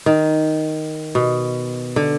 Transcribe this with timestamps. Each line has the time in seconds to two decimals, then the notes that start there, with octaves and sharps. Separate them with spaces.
0.06 D#3
1.15 B2
1.96 D3